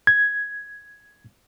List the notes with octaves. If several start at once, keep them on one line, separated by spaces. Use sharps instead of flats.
G#6